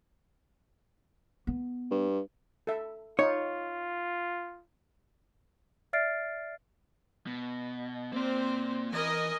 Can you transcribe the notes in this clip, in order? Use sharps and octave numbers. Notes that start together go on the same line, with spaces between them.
B3
G2
A4 E5
D#4 F4 C#5
D5 E5 F6 A6 C7 D7
B2
A#3 C4 C5 D5
E3 A#4 D#5 G#5